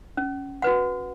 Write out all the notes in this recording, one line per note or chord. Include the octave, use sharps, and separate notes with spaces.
C#4
F#4 B4 F#5